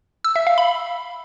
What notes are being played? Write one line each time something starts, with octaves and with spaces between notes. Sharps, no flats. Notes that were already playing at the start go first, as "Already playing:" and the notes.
E6
E5
F5
B5